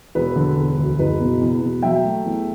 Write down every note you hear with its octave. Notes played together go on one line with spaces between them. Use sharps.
E1 B4
D3
E1
D2
F#1 B4
B2
E2
B2
F#3 E5 G5
A3
E2